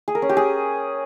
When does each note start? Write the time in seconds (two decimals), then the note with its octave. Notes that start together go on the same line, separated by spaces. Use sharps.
0.08 G#4
0.15 A#4
0.22 C#4
0.29 G4
0.37 G#4